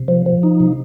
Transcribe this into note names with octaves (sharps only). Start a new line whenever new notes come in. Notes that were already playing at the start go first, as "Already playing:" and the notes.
Already playing: C3
F3
F3
D#4
C3